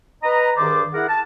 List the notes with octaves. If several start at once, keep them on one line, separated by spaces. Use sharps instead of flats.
B4 D#5 A#5
G2 D#3 G#4 C5 D5 D6
E4 G#4 A#4 F#5
A5